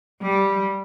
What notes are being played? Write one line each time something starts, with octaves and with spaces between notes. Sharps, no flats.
G3